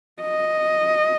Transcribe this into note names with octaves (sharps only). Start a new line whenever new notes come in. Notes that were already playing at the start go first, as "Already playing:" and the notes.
D#5